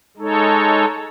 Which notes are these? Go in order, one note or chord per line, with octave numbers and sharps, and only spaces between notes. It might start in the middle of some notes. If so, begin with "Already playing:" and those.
G#3 D#4 A4 C#5